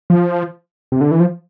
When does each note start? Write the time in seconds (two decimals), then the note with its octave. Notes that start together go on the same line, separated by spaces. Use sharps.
0.10 F3
0.92 C3
1.01 D3
1.11 E3
1.20 F3